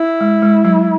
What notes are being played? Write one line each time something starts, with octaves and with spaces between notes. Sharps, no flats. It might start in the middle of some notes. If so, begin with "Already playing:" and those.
Already playing: E4
G#3
G#3
F#3